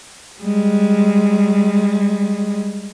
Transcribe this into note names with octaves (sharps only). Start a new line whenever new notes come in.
G3 G#3